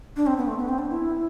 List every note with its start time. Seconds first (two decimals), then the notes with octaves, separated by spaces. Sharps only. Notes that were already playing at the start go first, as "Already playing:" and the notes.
0.16 D4
0.26 C4
0.37 B3
0.47 A3
0.58 B3
0.69 C4
0.78 D4
0.90 E4